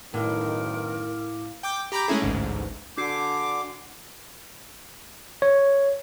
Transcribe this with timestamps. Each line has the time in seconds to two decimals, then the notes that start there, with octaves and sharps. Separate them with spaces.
0.14 B1 F#2 A2 D#3 E4 A#4 F5 D6
1.63 G5 D6 G6
1.92 G4 A#5 B5 D6 G6
2.08 G#3 A3 C#4 E4 G#4
2.22 A1 D2 G#2
2.97 D3 D4 F#4 D6 C7
5.42 C#5